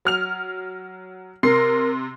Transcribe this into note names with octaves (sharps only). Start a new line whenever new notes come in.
F#3 F6 F7
C3 A#4 C6 C7